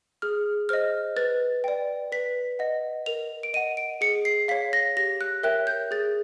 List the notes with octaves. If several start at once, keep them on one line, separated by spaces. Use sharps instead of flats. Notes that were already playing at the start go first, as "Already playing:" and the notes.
G#4 F6
C5 D#5 F6
B4 A6
D5 G5
B4 B6
D#5 F#5
A#4 F7
D7
D#5 F#5 D#7
D7
G#4 C#7
C7
C#5 F5 B6
A#6
G4 A#6
F#6
A#4 C#5 E5 G5 F#6
G6
G#4 A6